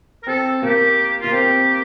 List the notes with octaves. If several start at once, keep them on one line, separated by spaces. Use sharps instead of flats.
A#4
C4 A4
A#3 G4
A#3 F4
C4 G4